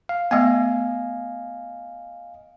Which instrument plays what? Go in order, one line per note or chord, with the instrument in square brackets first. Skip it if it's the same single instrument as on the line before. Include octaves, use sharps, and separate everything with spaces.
[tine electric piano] F5
[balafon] A3 B3 [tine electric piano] D#5 F5 G#5